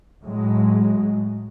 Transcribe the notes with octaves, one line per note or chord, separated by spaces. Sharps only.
A2 F#3 G#3